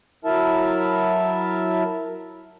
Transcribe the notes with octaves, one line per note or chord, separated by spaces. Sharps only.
F#3 E4 A#4 E5 A5